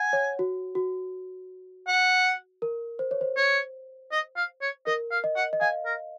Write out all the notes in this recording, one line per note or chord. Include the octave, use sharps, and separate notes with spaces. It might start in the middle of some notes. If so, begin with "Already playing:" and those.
Already playing: F#5 G#5
C#5
F#4
F#4
F#5
A#4
C5
C#5
C5
C#5
D#5
F5
C#5
A#4 D#5
F5
D#5
F#5
D#5
F5 G#5
A#4